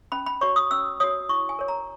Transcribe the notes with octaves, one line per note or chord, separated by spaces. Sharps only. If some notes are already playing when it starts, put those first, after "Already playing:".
C#4 B5
B5
F#4 C#5 C#6
D#6
C#4 E6
F#4 C#5 D#6
E4 C#6
G#5
A#4 C#5
A#5